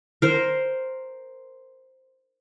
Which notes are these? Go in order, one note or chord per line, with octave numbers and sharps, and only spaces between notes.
A#4 C5